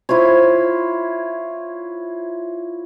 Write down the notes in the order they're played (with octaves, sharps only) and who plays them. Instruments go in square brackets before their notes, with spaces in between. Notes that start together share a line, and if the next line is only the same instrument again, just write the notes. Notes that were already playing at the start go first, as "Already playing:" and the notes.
[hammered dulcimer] E4 F4 C5 C#5